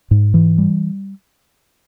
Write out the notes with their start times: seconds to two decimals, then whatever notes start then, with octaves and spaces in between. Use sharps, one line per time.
0.11 G#2
0.34 E3
0.58 G3